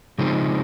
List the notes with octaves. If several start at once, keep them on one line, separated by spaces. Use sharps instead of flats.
C#3 F3 G#3 C4 D#4